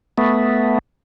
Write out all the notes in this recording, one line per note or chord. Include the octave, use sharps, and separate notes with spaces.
A3 B3